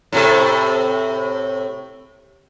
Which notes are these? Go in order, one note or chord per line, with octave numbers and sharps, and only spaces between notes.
A2 C3 A4